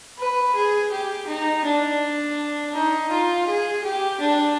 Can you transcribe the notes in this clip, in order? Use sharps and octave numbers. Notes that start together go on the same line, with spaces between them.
B4
G#4
G4
D#4
D4
D#4
F4
G#4
G4
D4